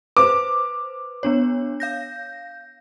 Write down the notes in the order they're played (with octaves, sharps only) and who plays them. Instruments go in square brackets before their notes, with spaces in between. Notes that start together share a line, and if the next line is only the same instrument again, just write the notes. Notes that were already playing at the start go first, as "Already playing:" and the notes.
[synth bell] B4 C5 [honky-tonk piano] D6
[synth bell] B3 D4 C#5
F5 G6 A#6